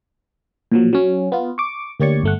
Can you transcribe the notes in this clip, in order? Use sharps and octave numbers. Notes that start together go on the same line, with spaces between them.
A#2 F3 F#3
F#3 C#4
B3 F4
C#6 D6
D2 A#3 G4 C#5 D5 C#6
G1 A3 F#5